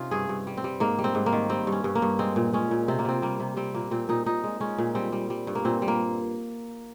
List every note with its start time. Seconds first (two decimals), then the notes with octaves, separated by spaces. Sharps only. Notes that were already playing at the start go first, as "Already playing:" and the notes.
Already playing: C3 C#4 D#4 F4
0.11 G2 G#4
0.29 G2
0.47 G3
0.57 C4
0.64 G3
0.80 G#2 A#3
0.99 G3
1.04 C4
1.15 G#2
1.26 A#3
1.32 D#3
1.49 G3 C4
1.67 G2
1.72 C#4
1.84 G2
1.95 A#3
2.02 G2
2.19 G#3 C4
2.36 A#2
2.53 G#3 C#4
2.71 A#2
2.88 C3 C4
2.99 A#3
3.05 C3 C4
3.22 G3 A#3
3.40 C3
3.57 G3 C4
3.74 A#2 A#3
3.91 A#2 C4
4.09 A#2 D#4
4.26 A#2 D#4
4.44 G#3
4.61 G#3 C#4
4.78 A#2
4.95 G3 C4
5.12 G3
5.30 G3
5.47 G2
5.55 A#3
5.65 A#2 C4
5.82 G3
5.88 A#3